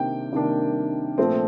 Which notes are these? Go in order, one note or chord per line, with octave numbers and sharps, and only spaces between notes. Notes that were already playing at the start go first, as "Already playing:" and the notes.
Already playing: C3 D#3 A#3 D4 G5
C3 D#3 A#3 D4
A#2 F3 A3 C4